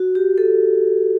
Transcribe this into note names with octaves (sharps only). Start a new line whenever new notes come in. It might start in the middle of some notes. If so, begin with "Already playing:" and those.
Already playing: F#4
G4
A4